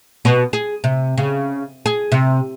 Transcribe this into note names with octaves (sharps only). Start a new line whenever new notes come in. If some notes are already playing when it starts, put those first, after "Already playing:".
B2
G#4
C3
C#3
G#4
C3